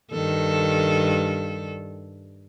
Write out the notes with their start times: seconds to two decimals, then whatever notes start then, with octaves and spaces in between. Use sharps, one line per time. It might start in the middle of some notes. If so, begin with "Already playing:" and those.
0.12 G2 D#3 A4